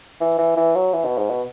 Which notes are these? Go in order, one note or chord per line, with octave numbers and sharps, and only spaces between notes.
E3
E3
E3
F#3
E3
B2
G#2
B2